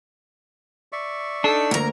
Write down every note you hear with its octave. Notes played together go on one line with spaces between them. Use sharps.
D5 E5 C#6
D4 D#4 A4
D2 A#3 A#4 A#5